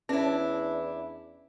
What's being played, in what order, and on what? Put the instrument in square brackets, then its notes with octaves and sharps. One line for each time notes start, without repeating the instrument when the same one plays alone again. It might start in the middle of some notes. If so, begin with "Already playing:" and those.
[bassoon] E2 [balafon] C#4 C#5 [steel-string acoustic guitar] D4 E4